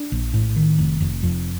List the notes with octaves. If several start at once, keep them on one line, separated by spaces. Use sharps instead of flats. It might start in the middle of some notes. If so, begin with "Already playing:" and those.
Already playing: D4
A#1
A2
D#3
F1
F1
F2